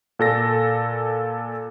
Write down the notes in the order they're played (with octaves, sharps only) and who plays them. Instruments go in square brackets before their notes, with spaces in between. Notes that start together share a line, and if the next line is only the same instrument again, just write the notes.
[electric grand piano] A#2 A4 A#6